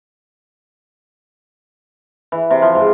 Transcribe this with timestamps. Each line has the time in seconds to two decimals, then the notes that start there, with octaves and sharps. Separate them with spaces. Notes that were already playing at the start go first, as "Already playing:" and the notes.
2.32 E3
2.50 C3
2.62 F3
2.75 G#2